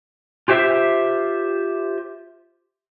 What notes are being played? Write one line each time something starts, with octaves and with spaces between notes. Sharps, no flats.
F4 G4 C5 E5